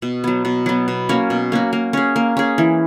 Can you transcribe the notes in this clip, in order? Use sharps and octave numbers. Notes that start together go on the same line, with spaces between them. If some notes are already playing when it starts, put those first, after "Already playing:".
B2
F#3 B3
B2
F#3 B3
B2
A#3 C#4 F#4
B2
A#3 C#4 F#4
A#3
C#4 G#4
A#3
C#4 G#4
E3